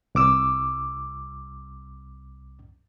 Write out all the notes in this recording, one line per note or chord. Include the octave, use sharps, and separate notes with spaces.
C2 D6 E6